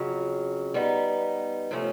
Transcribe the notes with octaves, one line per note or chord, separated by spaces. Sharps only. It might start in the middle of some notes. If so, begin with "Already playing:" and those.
Already playing: F2 C#3 F#3
G3 B3 D#4
C3 F3 A3 C#4